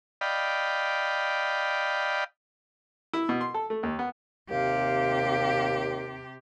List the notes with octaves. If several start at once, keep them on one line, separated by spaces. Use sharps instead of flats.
D5 D#5 F5 G5 B5
E4
B2
C6
A4
A3
D#2
B3
D#2 C3 G4 F5